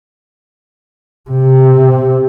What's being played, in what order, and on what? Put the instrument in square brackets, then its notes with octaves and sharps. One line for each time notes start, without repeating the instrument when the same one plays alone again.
[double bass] C3